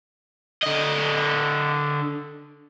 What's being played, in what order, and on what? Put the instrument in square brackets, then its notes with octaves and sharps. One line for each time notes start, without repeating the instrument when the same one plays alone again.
[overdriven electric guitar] D3 D#5